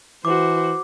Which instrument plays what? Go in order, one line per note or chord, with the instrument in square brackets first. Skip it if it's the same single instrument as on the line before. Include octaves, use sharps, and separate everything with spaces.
[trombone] E3 [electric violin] F#4 C5 [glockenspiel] D6